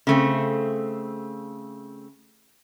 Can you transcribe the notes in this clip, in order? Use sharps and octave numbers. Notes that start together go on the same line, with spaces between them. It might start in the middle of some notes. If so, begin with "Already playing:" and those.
C#3 A3 C4